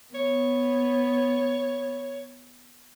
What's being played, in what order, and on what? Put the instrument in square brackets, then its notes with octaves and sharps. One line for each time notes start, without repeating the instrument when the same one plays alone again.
[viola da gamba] B3 [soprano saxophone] C#5